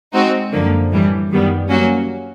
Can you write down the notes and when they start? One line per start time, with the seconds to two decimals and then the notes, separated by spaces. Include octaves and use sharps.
0.13 G#3 C4 D#4 F#4
0.52 F#2 D3 F3 A#3
0.92 A2 E3 G3
1.30 F#2 D#3 G3 B3
1.69 F#3 A#3 C#4 F#4